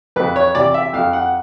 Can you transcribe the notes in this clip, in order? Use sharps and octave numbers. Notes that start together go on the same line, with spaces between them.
F2 B4
C#5
C3 E3 D5
E5
F2 F5
F#5